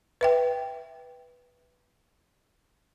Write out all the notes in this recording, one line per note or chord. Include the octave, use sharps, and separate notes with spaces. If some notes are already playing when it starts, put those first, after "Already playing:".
B4 E5 G5